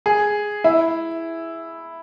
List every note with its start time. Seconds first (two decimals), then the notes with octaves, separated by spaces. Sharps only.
0.06 G#4
0.64 E4